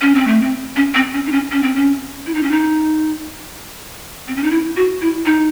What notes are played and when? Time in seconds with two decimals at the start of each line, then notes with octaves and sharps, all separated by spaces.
0.01 C#4
0.15 C4
0.27 A3
0.42 C4
0.76 C#4
0.94 C4
1.14 C#4
1.27 D#4
1.32 C#4
1.51 C#4
1.63 C4
1.76 C#4
2.26 E4
2.34 D#4
2.43 C#4
2.51 D#4
4.28 C4
4.36 C#4
4.44 D#4
4.51 E4
4.77 F#4
5.02 E4
5.26 D#4